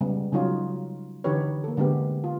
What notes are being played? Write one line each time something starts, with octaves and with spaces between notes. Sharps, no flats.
C#3 G3 G#3 B3
C#3 F#3 D#4 F4 C#5
D3 E3 D#4 G4 B4 C#5
A#3 A4
D3 G#3 B3 G4
F4